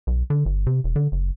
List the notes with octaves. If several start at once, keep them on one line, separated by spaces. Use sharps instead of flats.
B1
D3
G1
C3
E1
D3
F#1